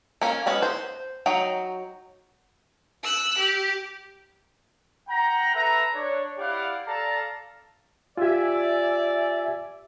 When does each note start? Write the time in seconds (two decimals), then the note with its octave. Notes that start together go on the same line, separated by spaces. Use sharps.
0.21 A#3 C#4
0.46 G#3 B3 C#4 F#4
0.62 C5
1.26 F#3 D#4 G5
3.03 E6 F#6
3.38 G4
5.08 F#5 G5 A#5
5.53 A4 B4 E5 A#5
5.94 D4 C#5
6.38 E4 G4 D5 F5 F#5
6.86 A4 D5 F5 A5 A#5
8.17 F4 G4 D5 E5 G#5